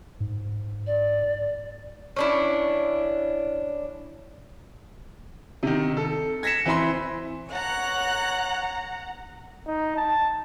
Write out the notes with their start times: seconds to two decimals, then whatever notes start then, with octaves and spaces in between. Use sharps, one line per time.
0.20 G#2
0.87 D5
2.16 C#4 D4 E4
5.63 C3 D#3
5.97 A4
6.43 G#6 A#6 B6 C#7 E7
6.65 E3 C4 E4 B5 C6
7.52 C#5 F#5 A#5 F#6
9.67 D#4
9.96 A5